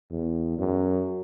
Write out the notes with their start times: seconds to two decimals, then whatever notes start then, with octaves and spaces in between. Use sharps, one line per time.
0.11 E2
0.58 F#2